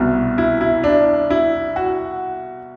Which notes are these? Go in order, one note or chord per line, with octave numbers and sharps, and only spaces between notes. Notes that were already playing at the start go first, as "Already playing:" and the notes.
Already playing: C2 B2
E4
E4
D4
E4
F#4